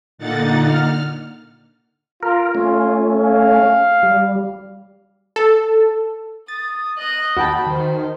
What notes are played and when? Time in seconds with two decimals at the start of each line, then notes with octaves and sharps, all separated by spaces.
0.18 A#2 D3 A#3 D#4 F#5 A6
0.63 F6
2.23 F4 A#4
2.55 A3 C#4 F4
3.19 F5
4.03 G3
5.36 A4
6.48 D#6 A6
6.98 D#5 F#6
7.37 D#2 F#4 G5 A5 B5
7.67 D#3 C5